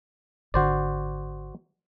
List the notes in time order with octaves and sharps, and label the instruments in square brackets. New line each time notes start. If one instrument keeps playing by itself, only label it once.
[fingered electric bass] G#1 D3 [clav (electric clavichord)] F#4 C5 D5